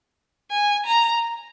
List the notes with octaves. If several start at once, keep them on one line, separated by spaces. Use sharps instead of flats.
G#5
A#5